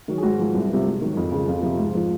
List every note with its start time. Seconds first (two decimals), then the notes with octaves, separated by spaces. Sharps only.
0.08 D#3 F#3
0.18 G#4
0.23 G#2 F#4
0.39 F3
0.54 C2
0.70 C3 F3
0.85 G#2
1.01 D#3 F#3
1.17 F2
1.32 C#3 F3
1.48 F2 F4
1.63 C3 F3
1.78 G#2
1.95 F3